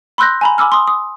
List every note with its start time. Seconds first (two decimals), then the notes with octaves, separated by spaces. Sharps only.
0.18 B5 C6 E6 F#6 G6 A#6
0.41 G#5 A#5 B5
0.58 G#5 B5 D6 E6 F6
0.72 C6 D#6
0.87 D#6